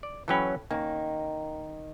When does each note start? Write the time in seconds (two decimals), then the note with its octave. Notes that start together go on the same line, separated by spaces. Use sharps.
0.03 D5
0.28 E3 F#3 C#4 A4 G5 B5
0.71 D#3 A#3 C#4